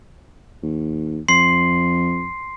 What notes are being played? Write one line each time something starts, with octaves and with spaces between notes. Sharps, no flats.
D#2
F2 C6 C7